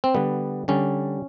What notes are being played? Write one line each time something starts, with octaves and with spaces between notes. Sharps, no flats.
C4
D3 G3 B3
D3 G3 C#4